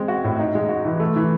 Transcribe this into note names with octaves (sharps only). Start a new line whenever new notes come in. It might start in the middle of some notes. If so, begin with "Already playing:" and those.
Already playing: G#3 C4
F#4
A2
D#4
G#3
F#4
E3
A3
E3